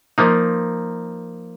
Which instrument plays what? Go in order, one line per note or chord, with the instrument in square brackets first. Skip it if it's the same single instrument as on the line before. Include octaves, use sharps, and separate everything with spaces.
[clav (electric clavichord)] F3 A#3 D#4